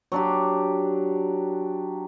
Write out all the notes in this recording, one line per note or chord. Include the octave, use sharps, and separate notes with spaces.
F#3 D4 G4